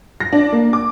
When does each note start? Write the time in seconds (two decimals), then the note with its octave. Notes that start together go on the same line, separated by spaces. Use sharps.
0.20 A#6
0.33 D4
0.52 A#3
0.73 D6